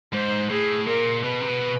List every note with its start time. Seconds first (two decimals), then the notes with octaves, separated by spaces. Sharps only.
0.13 G#2 C5
0.50 A2 G#4
0.86 A#2 A#4
1.24 B2 B4
1.41 C3
1.49 B2